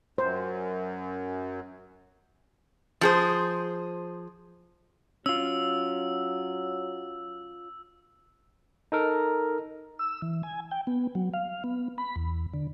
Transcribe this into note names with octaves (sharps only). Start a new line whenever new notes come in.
F#2 C5
F3 G#4 C5
F#3 C#4 F4 E6
D#4 A4 A#4
E6
E3
G#5
G5
B3
F#3
F5
B3
B5
E2
D3